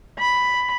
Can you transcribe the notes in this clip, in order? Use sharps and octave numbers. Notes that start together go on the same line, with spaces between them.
B5